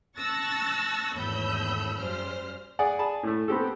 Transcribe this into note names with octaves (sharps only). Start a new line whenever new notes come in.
A5 C#6 E6 F#6 A6 A#6
G#1 E2 A2 B5 E6 G6
F#2 C#3 G3 C5 F6
G#4 D5 F#5
G#4 A5 B5
A2 A3
B3 C4 G4 A4